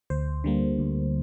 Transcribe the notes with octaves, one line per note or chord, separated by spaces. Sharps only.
D2 C5
D3 G3 A#3
D2